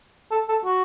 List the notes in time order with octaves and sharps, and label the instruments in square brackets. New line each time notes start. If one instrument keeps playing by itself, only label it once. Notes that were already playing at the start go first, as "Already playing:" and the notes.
[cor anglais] A4
A4
F#4